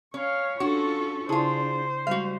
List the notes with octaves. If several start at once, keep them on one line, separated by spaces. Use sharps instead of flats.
C#4 C#5 F5
C#4 D4 F4 F#4 A4 C#6
C#3 D4 E4 F4 G#4 C5 A5
G3 G#3 F#4 F5